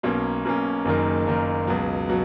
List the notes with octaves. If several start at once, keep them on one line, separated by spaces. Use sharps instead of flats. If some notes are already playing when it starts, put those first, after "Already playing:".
B1 B2 A#3 C#4
B1 B2 A#3 C#4
F#1 F#2 D#3 A#3 D#4
F#1 F#2 D#3 A#3 D#4
C#2 B2 F#3
B2 F#3